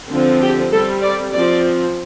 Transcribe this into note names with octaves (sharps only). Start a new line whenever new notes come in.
D3 F3 C4
G4
G3 C4 A4
D5
F3 C4 D5